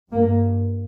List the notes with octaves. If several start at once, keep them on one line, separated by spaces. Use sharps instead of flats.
G2 A#3